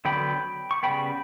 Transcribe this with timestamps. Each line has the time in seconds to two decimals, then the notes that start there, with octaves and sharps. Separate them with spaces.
0.05 D3 F#3 B3 G5 B5
0.71 C#6
0.83 C#3 G3 B3 G5 B5